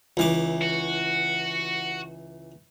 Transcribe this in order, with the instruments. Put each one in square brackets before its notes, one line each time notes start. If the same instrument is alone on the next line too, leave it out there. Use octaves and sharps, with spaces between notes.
[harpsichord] C#2 E3 D6
[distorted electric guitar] F#4